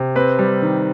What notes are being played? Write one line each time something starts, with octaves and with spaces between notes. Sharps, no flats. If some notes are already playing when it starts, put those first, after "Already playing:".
Already playing: C3
C4 B4
G3
D#3